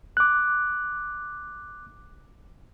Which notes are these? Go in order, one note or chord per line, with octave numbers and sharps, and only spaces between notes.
D6 F#6